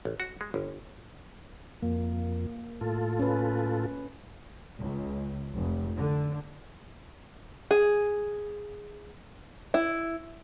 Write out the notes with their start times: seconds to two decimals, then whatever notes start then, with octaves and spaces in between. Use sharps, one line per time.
0.05 A1
0.20 F#4
0.41 G#3
0.54 G1
1.82 F2 A#3
2.81 A2 F4 A4
3.19 C#4 B4
4.79 C#2
5.54 F1
5.96 D3
7.71 G#4
9.74 E4